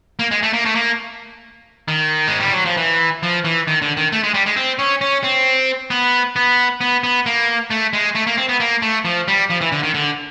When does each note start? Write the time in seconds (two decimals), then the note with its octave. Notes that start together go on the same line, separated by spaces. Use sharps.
0.19 A#3
0.31 G#3
0.43 A3
0.53 A#3
0.65 A3
0.75 A#3
1.88 D#3
2.27 G#3
2.40 G3
2.52 F#3
2.66 F3
2.77 E3
3.23 F3
3.45 E3
3.68 D#3
3.82 D3
3.97 D#3
4.12 A3
4.23 G#3
4.34 G3
4.46 G#3
4.56 C4
4.79 C#4
5.01 C#4
5.24 C4
5.90 B3
6.36 B3
6.81 B3
7.04 B3
7.26 A#3
7.71 A3
7.93 G#3
8.15 A3
8.27 A#3
8.37 C4
8.49 B3
8.60 A#3
8.82 A3
9.05 F3
9.28 G3
9.50 F3
9.61 E3
9.72 D3
9.83 D#3
9.94 D3